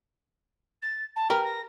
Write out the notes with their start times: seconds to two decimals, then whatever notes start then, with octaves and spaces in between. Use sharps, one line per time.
0.82 A6
1.16 A5
1.30 G4 A#4 B4 F6
1.44 A#6